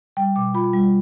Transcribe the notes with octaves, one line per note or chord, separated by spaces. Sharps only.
G3 G5
B2 D6
F4 B5
G3